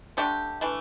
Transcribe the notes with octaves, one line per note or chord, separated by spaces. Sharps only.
D3 A3 D4 G4
E3 A3 D4